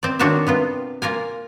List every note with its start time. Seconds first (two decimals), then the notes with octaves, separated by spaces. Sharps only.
0.03 C4 D5
0.19 D#3 C4 D4 F#4 C#5 E5
0.47 C3 B3 F4
1.02 A#3 F4 A#4 G#5